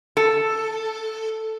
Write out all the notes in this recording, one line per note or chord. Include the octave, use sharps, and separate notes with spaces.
A4